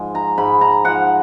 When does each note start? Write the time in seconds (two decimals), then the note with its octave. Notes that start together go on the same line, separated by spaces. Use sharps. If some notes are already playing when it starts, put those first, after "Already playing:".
Already playing: G#2 F3 G#3
0.15 A#5
0.38 G#2 B5
0.61 A#5
0.85 F3 F#5